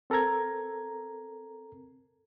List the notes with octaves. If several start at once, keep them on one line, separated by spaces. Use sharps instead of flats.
C4 A4 A#4 A#5 G#6